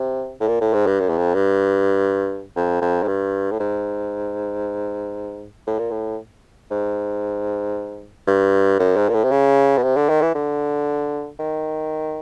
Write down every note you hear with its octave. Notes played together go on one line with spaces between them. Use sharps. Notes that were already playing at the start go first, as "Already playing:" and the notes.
Already playing: C3
A2
A#2
A2
G#2
G2
F#2
E2
F2
G2
F2
F2
G#2
G2
A2
G#2
A2
A#2
A2
G#2
G2
F#2
G#2
A#2
A2
C3
C#3
B2
C3
D3
D#3
E3
D3
D#3